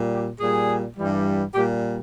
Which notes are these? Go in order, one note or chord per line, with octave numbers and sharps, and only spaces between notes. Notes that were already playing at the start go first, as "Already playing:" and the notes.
Already playing: A#2 G3
G4
A#2 G3 G#4
G2 E3 G3
A#2 G3 G4